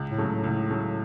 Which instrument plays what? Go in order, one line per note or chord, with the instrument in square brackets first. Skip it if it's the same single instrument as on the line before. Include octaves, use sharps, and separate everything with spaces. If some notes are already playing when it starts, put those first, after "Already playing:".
Already playing: [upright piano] C#2
[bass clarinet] A2
[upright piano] C#3 F#3 A3
[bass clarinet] A2
[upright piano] C#2
C#3 F#3 A3